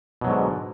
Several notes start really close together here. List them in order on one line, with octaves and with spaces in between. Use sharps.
B2 F#3 G#2 D3